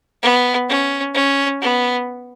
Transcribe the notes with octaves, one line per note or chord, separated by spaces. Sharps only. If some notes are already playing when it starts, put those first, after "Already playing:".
B3
C#4
C#4
B3